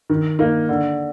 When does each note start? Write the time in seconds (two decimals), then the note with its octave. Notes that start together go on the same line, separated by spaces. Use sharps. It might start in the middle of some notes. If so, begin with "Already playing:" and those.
0.10 D#3
0.39 A#3 D#4
0.69 D3